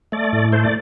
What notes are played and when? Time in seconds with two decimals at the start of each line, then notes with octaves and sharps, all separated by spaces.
0.12 A3 D5
0.33 A2
0.52 A3 C5
0.63 D5